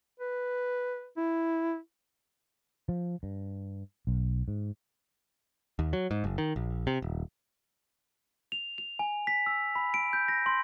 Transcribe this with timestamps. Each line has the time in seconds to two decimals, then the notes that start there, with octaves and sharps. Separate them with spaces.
0.20 B4
1.17 E4
2.89 F3
3.23 G2
4.07 B1
4.48 G#2
5.79 D#2
5.93 F#3
6.11 G#2
6.24 F#1
6.38 D#3
6.56 A#1
6.87 C3
7.02 D#1
8.52 F7
8.78 F7
8.99 G#5
9.27 B6
9.46 E6
9.75 B5
9.94 D7
10.13 G6
10.28 A#6
10.46 C6